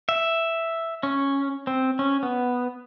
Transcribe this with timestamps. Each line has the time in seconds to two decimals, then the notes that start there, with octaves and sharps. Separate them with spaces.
0.09 E5
1.03 C#4
1.67 C4
1.99 C#4
2.23 B3